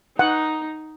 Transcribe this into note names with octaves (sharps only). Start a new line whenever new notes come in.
D#4 F#5